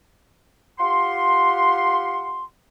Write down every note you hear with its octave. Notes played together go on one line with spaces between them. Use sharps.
F4 G4 F#5 C6